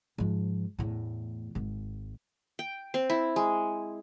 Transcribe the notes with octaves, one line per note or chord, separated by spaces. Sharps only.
G#2 F3
E2 A2
G#1 G#2
G5
C4
E4
G#3